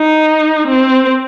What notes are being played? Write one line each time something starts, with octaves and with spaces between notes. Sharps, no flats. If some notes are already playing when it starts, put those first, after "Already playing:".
Already playing: D#4
C4